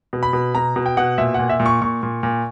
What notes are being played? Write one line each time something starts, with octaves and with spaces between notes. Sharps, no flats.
B2
B5
B2
B2 A#5
B2
G5
B2 F#5
A#2 E5
A#2 F#5
E5
A#2
C#6
A#2 C#6
A#2
A#2